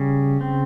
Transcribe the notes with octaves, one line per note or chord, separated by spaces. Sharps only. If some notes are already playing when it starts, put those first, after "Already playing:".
Already playing: C#3 G3
C4